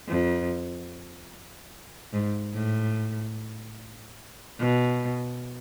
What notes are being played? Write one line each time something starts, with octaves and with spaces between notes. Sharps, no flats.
F2
G#2
A2
B2